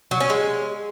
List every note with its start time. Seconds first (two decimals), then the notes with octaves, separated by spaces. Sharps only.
0.11 F#3
0.20 C#4
0.30 G#3